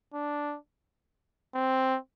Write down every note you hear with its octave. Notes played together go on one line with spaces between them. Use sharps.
D4
C4